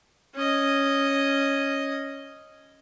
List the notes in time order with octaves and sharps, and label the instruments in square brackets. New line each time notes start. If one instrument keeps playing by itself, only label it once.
[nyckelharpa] C#4 D#5